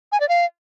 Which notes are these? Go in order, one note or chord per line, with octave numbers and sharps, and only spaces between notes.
G#5
D5
F5